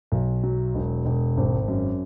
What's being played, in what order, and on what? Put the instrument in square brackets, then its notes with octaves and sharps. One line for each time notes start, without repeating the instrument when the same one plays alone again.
[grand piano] B1
F#3
E1
E1
G#1
F#2